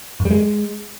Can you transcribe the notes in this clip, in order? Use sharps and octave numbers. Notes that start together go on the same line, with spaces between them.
F2
G3
G#3